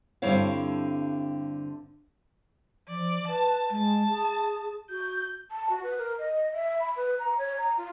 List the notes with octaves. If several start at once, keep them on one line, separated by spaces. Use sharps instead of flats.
G2 D3 C4 E4 C#5 F5
F3 D5
B4 A5
G#3 A5
G#4
F#4 G6
A5
F#4
B4
A#4
D#5
E5
B5
B4
A#5
C#5
A#5
F4